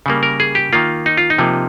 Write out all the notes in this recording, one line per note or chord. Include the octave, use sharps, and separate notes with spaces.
C#3 G3 A#3
A#4
G#4
G4
D#3 A#3 F4
D#4
F4
D#4
C3 F3 A#3